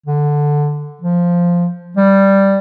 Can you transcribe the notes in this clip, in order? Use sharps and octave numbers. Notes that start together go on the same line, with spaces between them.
D3
F3
G3